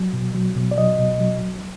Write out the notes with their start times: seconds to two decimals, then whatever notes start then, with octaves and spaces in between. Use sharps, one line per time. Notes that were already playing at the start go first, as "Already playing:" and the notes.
Already playing: F#3
0.13 B2
0.35 F#3
0.56 B2
0.71 D5
0.78 F#3 D#5
0.99 B2
1.20 F#3